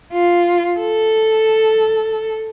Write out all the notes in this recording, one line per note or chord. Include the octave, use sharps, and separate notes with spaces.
F4
A4